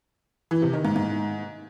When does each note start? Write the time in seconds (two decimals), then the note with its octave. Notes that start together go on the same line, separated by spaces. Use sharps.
0.51 E3
0.62 C3
0.73 D#3
0.85 G#2
0.96 G#2